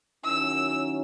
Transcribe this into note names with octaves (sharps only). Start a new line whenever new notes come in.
D#3 F#3 C#4 E4 E6